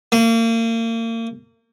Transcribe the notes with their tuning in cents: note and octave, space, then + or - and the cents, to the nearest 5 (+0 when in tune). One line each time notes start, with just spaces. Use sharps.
A#3 -35